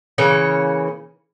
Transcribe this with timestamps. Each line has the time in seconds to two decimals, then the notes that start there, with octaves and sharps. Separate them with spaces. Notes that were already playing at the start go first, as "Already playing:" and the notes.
0.18 C#3 E3 A#3 C#5